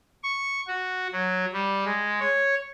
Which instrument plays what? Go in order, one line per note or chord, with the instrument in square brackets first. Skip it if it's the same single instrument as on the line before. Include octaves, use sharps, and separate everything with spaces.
[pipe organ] C#6
F#4
F#3
G3
G#3
C#5